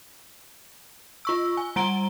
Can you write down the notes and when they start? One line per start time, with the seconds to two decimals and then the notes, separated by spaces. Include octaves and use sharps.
1.25 F4 C#6 E6
1.57 G#5
1.76 G3 A#5 D7 G7